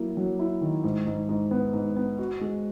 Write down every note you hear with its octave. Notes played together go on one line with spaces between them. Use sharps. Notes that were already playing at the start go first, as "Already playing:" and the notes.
Already playing: F#3 A#3 E4
F#3
E4
D#3
G#2
G#2
G#2
B3
G#2
B3
F#4
G#3